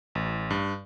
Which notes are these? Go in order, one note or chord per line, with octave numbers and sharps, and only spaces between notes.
A1
G2